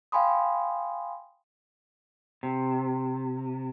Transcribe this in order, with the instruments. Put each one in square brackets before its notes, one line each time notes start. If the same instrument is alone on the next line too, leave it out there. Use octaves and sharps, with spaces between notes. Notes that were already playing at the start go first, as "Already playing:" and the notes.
[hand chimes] F5 G5 G#5 B5 C6 D#6
[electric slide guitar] C3